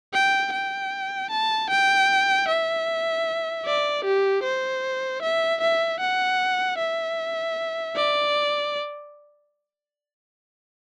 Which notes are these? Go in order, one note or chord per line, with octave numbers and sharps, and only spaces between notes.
G5
G5
A5
G5
E5
D5
G4
C5
E5
E5
F#5
E5
D5